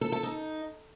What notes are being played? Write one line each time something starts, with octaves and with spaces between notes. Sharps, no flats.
A4
A4
D#4